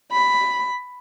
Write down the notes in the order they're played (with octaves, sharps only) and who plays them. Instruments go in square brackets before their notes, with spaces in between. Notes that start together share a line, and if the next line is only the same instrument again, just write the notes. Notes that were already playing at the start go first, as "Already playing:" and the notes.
[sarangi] B5